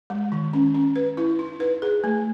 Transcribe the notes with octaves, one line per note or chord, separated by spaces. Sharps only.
G#3
D#3
C#4
C#4
B4
E4
D#4
B4
G#4
A3